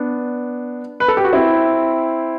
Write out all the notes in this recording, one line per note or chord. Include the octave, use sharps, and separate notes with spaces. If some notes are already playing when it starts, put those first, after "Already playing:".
Already playing: B3 D4
B4
A4
G4
F#4
C4 E4